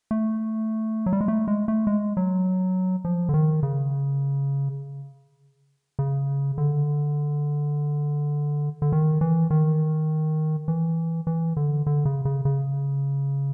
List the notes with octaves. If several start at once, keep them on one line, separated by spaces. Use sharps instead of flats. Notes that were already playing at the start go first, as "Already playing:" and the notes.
A3
F#3
G3
G#3
A3
G#3
A3
G#3
F#3
F3
D3
D#3
C#3
C#3
D3
D3
D#3
E3
D#3
E3
E3
D3
D3
C#3
C#3
C#3